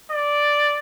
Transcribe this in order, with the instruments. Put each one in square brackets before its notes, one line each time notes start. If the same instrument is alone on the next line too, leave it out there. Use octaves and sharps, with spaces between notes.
[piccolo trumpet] D5